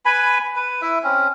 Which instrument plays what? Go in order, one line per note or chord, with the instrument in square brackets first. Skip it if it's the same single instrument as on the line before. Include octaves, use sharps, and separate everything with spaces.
[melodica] B4 G#5 B5
B4
E4 E5
C4 C#4